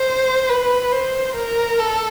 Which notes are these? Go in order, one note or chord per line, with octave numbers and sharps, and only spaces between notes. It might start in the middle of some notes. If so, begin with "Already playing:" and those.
Already playing: C5
B4
C5
A#4
A4